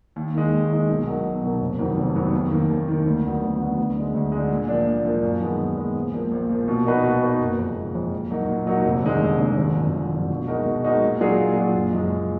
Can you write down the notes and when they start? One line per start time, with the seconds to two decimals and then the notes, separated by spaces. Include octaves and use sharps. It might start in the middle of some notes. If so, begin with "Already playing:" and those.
0.16 D#2
0.34 D#3 G#3
0.52 D#2
0.71 D#3 G#3
0.89 B1
1.06 B2 F#3 A#3 D#4
1.25 B1
1.43 B2 F#3 A#3 D#4
1.60 F1
1.79 F2 D#3 F#3 B3
1.97 F1
2.15 F2 D#3 F#3 B3
2.33 D#2
2.51 D#3 A#3
2.70 D#2
2.88 D#3 A#3
3.06 D2
3.24 D3 F#3 B3
3.42 D2
3.60 D3 F#3 B3
3.78 D2
3.96 D3 G#3
4.14 D2
4.32 D3 G#3
4.51 A#2
4.68 F3 A#3 D4
4.87 A#2
5.05 F3 A#3 D4
5.23 F#2
5.41 D#3 G#3 B3
5.59 F#2
5.77 D#3 G#3 B3
5.95 A#1
6.13 A#2 F3 A#3
6.31 A#1
6.49 A#2 F3 A#3
6.68 B2
6.85 A#3 D#4 F#4 B4
7.04 B2
7.22 A#3 D#4 F#4 B4
7.40 F#1
7.59 F2 F3 G#3
7.76 F#1
7.95 F2 F3 G#3
8.12 A#2
8.31 F#3 A#3 D#4 F#4
8.49 A#2
8.67 F#3 A#3 D#4 F#4
8.85 F1
9.03 D#2 D3 G#3 D#4
9.21 F1
9.39 D#2 D3 G#3 D#4
9.57 G#1
9.76 F#2 D3 F3
9.93 G#1
10.12 F#2 D3 F3
10.30 B2
10.48 G#3 D#4 F#4 A#4
10.66 B2
10.84 G#3 D#4 F#4 A#4
11.02 A#2
11.20 F#3 D4 F4 G#4
11.39 A#2
11.57 F#3 D4 F4 G#4
11.74 F#1
11.93 F#2 F3 G#3
12.11 F#1